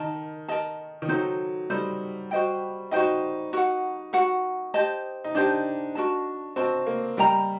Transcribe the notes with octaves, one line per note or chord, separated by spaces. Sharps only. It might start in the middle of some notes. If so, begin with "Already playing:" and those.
Already playing: D#3 A#4 D#5 A5
A#4 D#5 A5
D#3
F#3 D#4 A4 C5
G3 D#4 A4 C5
F#4 C5 D#5 G5
D#4 F#4 C5 D#5 G5
F#4 A#4 F#5
F#4 A#4 F#5
G4 C5 D#5 A5
D#4
D4 G4 C5 D#5 A5
F#4 A#4 D#5 A5
C4 F#4 A#4 D#5 A5
A#3
G3 A#4 D#5 G5 A#5